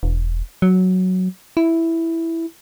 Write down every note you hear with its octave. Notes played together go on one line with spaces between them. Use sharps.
E1
F#3
E4